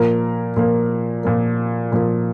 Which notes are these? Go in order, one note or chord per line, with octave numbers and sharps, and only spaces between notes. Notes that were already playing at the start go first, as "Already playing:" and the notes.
Already playing: A#2 F3 A#3 A#4
A#2 F3 A#3
A#2 F3 A#3
A#2 F3 A#3